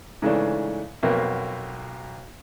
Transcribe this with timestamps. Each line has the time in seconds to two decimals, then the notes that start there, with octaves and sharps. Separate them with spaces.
0.22 G#2 C#3 E3 A3 D4
1.03 B1 F2 B2 A#3